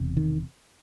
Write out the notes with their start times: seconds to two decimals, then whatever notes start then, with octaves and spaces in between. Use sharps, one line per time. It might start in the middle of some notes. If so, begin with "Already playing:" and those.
Already playing: E1 E2 C3
0.17 D#3